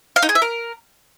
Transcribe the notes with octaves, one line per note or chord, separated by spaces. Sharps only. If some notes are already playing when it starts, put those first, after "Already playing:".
F5
D#4
G#4
E5
A#4